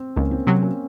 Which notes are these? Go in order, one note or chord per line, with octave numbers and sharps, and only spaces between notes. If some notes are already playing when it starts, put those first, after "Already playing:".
Already playing: C4
C#2 A#3 C#4
C4
C3 F#3 C4
A#3 C#4